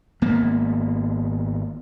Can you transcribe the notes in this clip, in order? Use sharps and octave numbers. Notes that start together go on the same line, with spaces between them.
G#1 A#3 B3